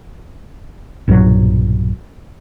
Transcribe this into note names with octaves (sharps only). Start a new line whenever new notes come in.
B1 G2 A#2 F#3